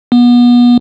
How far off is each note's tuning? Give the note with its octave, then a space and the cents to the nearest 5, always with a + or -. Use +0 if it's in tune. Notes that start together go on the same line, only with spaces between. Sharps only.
B3 -30